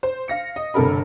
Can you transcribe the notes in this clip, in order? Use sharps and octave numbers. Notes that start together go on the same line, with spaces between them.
C5
F5 A#6 C#7
D#5
G1 C3 A4 A#4 B5